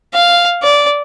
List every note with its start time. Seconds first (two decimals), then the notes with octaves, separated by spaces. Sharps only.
0.13 F5
0.63 D5